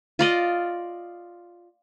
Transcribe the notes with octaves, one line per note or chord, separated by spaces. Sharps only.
F4 D5 D#5